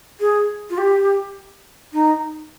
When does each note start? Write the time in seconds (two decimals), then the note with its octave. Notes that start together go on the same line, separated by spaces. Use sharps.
0.20 G#4
0.70 F4
0.78 G4
1.93 D#4